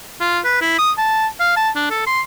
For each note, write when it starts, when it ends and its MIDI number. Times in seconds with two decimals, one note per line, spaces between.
0.20 0.39 65
0.45 0.57 71
0.61 0.75 64
0.79 0.91 87
0.98 1.27 81
1.40 1.54 77
1.57 1.70 81
1.76 1.86 62
1.90 2.05 69
2.07 2.21 84